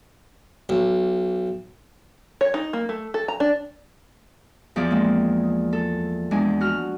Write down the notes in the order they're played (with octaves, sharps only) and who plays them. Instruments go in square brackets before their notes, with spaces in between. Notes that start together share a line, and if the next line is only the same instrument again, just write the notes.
[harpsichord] B1
[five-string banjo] C#5
D#4
A#3
A3
A4
A#5
D4
[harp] E2 F3 G#4 D5
G#3 A#3 C4
A4
E2 G#3 D4 G#5
F#4 F6